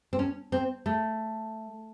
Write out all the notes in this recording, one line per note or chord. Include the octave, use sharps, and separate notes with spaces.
C4
C#4
C4
A3